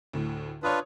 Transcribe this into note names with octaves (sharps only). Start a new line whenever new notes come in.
D2 A2
D4 F4 B4 C#5 D#6